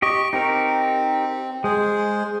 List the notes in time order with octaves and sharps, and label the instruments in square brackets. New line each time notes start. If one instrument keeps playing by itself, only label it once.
[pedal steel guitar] G4 D#5 [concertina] C#6
[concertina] C4 [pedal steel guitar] D#4 G4 A#4
[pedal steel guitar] G#3 [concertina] G#4 C5